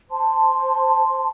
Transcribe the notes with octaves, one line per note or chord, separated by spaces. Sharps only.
C5 A5 C6